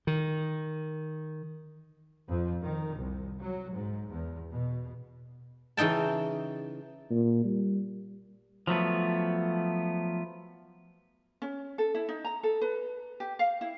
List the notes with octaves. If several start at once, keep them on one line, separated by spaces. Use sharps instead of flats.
D#3
F2
D#3
C2
F#3
G#2
E2
B2
C#3 E3 D#4 G5 A5
A#2
G3
F3 F#3 A3 B3
C#4
A4
E4
D#4
A#5
A4
B4
G4
F5
E4